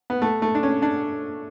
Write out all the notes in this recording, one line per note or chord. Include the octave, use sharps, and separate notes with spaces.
B3
A3
A3
D4
C#4
D4